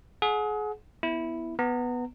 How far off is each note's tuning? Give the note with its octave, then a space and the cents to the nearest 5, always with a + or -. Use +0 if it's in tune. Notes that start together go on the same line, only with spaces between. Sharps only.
G#4 +30 F#5 -20
B3 +0 E4 +0
B3 +0 A#5 -35